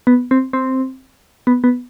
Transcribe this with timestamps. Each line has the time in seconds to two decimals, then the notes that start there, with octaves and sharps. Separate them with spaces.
0.07 B3
0.31 C4
0.53 C4
1.47 B3
1.64 B3